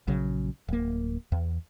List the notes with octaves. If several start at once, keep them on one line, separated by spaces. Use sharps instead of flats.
A#1 C#3 F#3
D1 A#3
E2